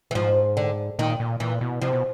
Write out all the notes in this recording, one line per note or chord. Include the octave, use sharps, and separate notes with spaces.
E3
G#2 F3
D3
A#2 D#3
A#2
A#2 E3
B2
C3 F3
B2